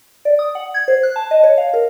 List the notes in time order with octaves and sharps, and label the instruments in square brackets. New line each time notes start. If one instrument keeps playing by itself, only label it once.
[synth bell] D5
D#6
F#5
G#6
C5
F#6
A5
D#5
C#5
F5
A#4